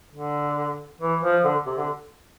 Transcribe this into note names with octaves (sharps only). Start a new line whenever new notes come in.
D3
E3
F3
D3
C3
D3